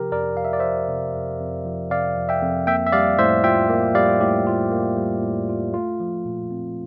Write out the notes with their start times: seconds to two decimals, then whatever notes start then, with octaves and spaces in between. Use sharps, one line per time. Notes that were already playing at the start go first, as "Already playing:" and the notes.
Already playing: C3 F3 G4 A#4
0.12 F2 A#4 D5
0.37 F2 F5
0.45 E5
0.53 D5
0.59 F3 C5 E5
0.88 C3
1.15 F2
1.40 F2
1.65 F3
1.91 C3 D5 F5
2.17 F2
2.29 E5 G5
2.42 F2
2.67 A#3 E5 G5
2.86 E5
2.92 G3 D5 F5
3.18 A2 C5 E5
3.44 F4 E5 G5
3.69 A#3
3.95 G3 D5 F5
4.20 A2 G4
4.47 F4
4.71 A#3
4.97 G3
5.23 A2
5.49 F4
5.74 A3 F4
6.00 F3
6.26 A#2
6.51 C4